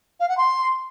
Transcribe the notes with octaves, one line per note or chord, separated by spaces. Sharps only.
F5
F#5
C6